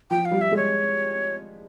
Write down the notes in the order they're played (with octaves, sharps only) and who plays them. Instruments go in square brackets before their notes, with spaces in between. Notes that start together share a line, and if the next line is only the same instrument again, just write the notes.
[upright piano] F3 [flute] G5
[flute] F5
[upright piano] G3
[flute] E5
[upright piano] G#3 [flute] C#5